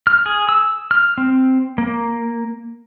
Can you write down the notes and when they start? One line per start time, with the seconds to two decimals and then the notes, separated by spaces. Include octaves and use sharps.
0.07 F6
0.26 G#4
0.49 E6
0.91 F6
1.18 C4
1.78 A#3